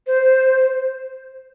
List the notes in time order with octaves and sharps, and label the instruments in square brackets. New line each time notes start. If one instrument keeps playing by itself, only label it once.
[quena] C5